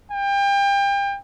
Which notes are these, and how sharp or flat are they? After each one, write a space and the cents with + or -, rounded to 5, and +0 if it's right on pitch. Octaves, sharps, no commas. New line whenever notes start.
G5 +30